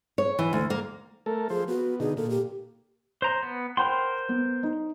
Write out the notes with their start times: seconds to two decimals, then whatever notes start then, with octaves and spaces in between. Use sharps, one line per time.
0.18 C#5
0.39 E3
0.53 D2
0.70 A#3
1.26 A3 A4 A#4
1.50 F3 G#4 C5
1.68 B3 F#4
2.00 B2 D3 D#4 G#4
2.17 A#2 A4
2.30 G4
3.22 C5 A#5
3.43 B3
3.77 A#4 C5 F#5 G5 B5 C6
4.29 B3
4.63 D#4